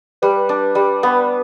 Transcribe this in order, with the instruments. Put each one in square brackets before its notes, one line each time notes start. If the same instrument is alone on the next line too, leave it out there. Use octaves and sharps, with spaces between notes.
[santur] G3 [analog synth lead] B4
[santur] D4
G3
B3